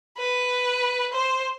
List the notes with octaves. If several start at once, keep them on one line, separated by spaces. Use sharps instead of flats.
B4
C5